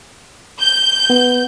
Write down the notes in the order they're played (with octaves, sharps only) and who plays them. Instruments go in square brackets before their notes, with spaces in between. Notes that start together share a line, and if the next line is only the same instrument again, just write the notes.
[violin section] G6
[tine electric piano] B3